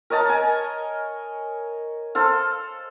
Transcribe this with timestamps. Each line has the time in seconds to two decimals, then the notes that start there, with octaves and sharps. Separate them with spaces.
0.10 A#4 C#5 D#5 A5
0.29 A#4 G#5
2.15 A4 C5 F5